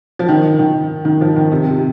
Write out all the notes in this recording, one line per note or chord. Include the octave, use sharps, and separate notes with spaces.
F3
D#3
D#3
D#3
F3
D#3
C3
C3